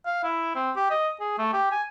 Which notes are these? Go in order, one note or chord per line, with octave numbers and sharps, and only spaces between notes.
F5
E4
C4
G4
D#5
G#4
A3
G4
G#5